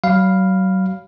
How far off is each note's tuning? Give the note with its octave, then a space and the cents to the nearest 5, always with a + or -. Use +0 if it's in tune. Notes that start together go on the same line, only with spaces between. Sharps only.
F#3 +35 F5 +0 B5 +0